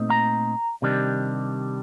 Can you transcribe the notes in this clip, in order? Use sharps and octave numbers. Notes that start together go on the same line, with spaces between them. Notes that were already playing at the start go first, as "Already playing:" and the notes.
Already playing: A#2 A3 C4 D#4
A#5
C3 D#3 G3 D4